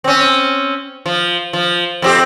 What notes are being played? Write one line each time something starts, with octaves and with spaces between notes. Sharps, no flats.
C4 C#4
F3
F3
F2 C4 G4